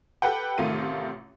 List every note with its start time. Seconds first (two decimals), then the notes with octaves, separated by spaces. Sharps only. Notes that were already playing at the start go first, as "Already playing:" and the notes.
0.22 G4 A4 B4 F#5 G5
0.58 A1 C3 D#3 A3 F4 D#7